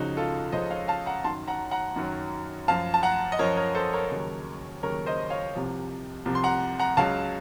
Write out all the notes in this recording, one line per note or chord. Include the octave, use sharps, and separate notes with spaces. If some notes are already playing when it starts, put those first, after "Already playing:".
Already playing: C#2 C#3 F3 D#4 F#4
F4 A4
C#2 C#3 F3 C5 D#5
C#5 F5
F5 A5
F#5 A#5
F#2 D#3 F#3 A5 C6
F#5 A#5
F#5 A#5
F#2 D#3 F#3
F#2 F3 F5 A5
A5
F#5 A#5
D#5
F#2 F3 A#4 C#5
A#4 C#5
A4 C5
A#4 C#5
D#2 C#3 F#3
D#2 C#3 F#3 A#4 C#5
C5 D#5
C#5 F5
C2 C3 F3
C2 C3 F3
C6
F#5 A#5
F#5 A#5
C#2 C#3 F#3 F5 A5